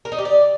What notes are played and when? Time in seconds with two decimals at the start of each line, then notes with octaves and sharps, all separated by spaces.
0.05 A#4
0.12 D#4
0.18 G4
0.25 D5